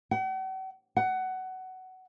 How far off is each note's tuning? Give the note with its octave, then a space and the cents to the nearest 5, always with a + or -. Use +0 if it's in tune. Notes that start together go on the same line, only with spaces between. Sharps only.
F#5 +45
F#5 +15